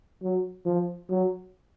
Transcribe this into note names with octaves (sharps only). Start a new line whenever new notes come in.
F#3
F3
F#3